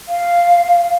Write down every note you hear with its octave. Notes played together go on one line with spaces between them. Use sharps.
F5